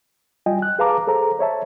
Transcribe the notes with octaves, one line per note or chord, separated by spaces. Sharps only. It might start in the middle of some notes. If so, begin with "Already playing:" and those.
G3 F4 D#5 G5 G#5
F#6
G#4 B4 F5 A5 A#5 D6
G#4 A4 C5 A#5
C5 C#5 E5 A5